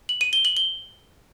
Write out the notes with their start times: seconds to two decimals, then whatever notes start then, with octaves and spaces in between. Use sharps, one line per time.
0.09 F#7
0.21 D#7
0.33 G7
0.45 F#7
0.57 G7